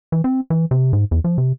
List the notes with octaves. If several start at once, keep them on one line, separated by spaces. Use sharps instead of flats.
E3
C4
E3
C3
G#2
E2
F3
C3